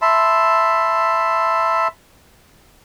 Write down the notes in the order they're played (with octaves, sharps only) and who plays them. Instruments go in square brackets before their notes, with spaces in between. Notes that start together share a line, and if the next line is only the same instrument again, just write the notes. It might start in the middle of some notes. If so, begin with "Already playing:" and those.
[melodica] E5 A5 B5 C6